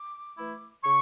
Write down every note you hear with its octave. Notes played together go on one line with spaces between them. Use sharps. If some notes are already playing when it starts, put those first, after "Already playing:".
Already playing: D6
E3 A3 E4
C#3 C#6